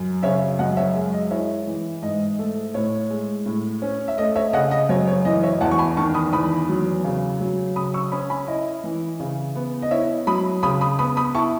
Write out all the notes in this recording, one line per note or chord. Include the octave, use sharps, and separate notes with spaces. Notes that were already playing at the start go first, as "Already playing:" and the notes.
Already playing: F#2
C#3 C#5 E5
F#2 D#5 F#5
C#5 E5
G#3
D#5
E4 C#5 E5
E3
G#2 D#5
A3
A2 C#5
G#3
A2
C#4
E5
A3 D#5
C#5 E5
C#3 D#5 F#5
D#5
F#2 C#5
C#5
E3 D#5
C#5 E5
E2 F#5 A5
C#6
G#5 B5
D#3 A5 C#6
B5 D#6
E2 B5 D#6
F#3
C#3
F#3
C#3 B5 D#6
C#6 E6
C#4 B5 D#6
G#5 B5
E4 D#5
E3
C#3
B3
D#5
E4 C#5 E5
F#3 B5 D#6
C#3 B5 D#6
B5 D#6
B3 B5 D#6
B5 D#6
E4 A5 C#6